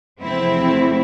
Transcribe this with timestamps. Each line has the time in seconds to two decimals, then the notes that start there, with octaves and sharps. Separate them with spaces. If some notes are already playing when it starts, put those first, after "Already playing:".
0.20 E2 C3 F3 A3 C4 E4